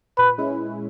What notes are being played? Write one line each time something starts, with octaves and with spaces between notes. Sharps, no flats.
A#2 B4
G#3 C#4 E4